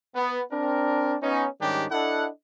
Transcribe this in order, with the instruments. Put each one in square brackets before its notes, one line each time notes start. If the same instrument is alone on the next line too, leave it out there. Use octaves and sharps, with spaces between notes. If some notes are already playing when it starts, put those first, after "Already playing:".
[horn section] B3
C4 D4 A#4
B3 C#4 D#4
G#2 D#3 G3 C#4 D4 G4
D4 E4 A4 D#5 F#5